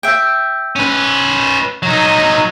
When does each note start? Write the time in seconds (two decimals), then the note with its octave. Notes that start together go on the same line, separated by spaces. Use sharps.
0.03 E5 G5
0.76 C#4 B4
1.83 F#3 D#4